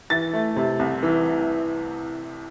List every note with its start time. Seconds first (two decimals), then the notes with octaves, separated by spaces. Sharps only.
0.10 E3 A6
0.33 A3
0.56 C3
0.79 C2
1.03 E3